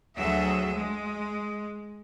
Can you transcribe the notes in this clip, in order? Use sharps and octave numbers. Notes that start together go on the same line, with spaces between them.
D2 F#3 G#4 E5
G#3